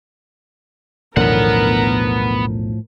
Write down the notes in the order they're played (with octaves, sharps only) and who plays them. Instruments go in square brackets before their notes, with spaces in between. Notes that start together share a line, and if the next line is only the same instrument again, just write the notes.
[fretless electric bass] B1 E2 D3 [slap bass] A2 F3 [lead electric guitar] B3 F#5 [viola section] A#4